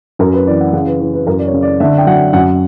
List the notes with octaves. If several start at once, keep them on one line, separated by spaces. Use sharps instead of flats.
F#2 A#4
B4
E3 D5
F#5
C#3 F#5
B4
E3 B4
B4
F#2 A#4
D5
C#5
C#3
D5
D3 E5
G5
F#3 F#5
F#2 F#5